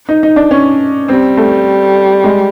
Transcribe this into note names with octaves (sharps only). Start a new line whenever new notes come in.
D#4
D#4
D4
C#4
G3 C4
A3
G#3